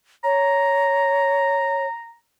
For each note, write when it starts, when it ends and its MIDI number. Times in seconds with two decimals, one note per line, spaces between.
0.24 1.86 73
0.24 2.17 82